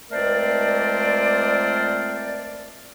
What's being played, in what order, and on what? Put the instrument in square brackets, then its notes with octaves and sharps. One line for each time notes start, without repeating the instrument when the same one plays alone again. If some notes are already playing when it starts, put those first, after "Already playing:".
[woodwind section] C#2 A3 C4 A#4 C5 D5